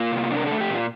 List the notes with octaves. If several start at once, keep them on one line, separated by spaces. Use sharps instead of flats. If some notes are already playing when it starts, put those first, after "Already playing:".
Already playing: A#3 F4
C3
D4
A#4
A3 A4
G4
A#2 F4